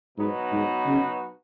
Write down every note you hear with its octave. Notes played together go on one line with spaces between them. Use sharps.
G#2 B2 F#3 B3 D#4 F#4
G#2
C#3